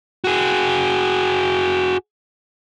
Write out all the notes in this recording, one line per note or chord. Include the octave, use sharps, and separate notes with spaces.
F#4 G#4